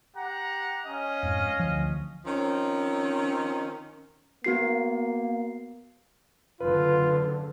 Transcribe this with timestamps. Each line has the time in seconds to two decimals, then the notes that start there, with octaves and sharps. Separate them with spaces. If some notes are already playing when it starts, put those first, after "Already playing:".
0.16 G4 F#5 A#5
0.87 C#4 D#5 F5
1.23 F2 G#2
1.59 D2 F3
2.25 D#3 F3 C4 C#4
4.44 A#3 B3 F#4 C7
6.61 F#1 D3 F4 B4